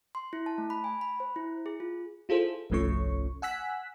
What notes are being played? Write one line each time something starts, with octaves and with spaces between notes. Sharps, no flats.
C6
E4
A5
A3
B5
G#5
B5
C5
E4
G#4
F4
E4 F4 G#4 A4 C5
G1 C2 F3 A3 C#4 C#6
F#5 G#5 E6 F#6 B6